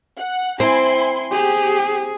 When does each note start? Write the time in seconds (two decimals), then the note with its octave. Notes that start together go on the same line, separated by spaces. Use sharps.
0.17 F#5
0.60 C4 E4 G#5 C6
1.32 G4 G#4